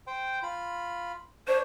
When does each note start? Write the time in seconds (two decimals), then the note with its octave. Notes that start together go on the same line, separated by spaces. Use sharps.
0.07 C5 G5
0.43 F4 B5
1.48 D4 C5 C#5